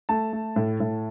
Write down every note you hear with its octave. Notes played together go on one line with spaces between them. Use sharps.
A3 A5
A3
A2
A2